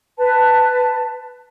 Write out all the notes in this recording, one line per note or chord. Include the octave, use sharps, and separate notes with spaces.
B4 A5